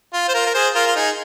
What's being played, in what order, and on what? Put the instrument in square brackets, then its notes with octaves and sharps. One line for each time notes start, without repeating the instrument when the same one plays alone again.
[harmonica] F4
C5
F4 A#4
A#4
G#4 C5
F4 A#4
F4
D#4 G#4